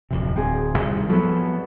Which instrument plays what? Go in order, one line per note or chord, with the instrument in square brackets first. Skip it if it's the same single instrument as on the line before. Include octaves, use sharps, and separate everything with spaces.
[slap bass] D1 F2 C3
[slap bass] D1 [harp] C4 G#4
[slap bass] C2 D#3
[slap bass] F3 B3 [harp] F#3 A4 B4